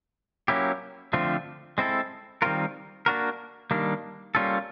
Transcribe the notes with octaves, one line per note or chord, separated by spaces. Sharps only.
F#3 A#3 C#4 E4 G4
D3 F3 A3 C4 F4
G#3 C4 E4 A4
D#3 G3 C4 F4 A#4
A#3 D4 F#4 A#4
D#3 G3 A#3 D4
G3 A#3 C#4 F4 A4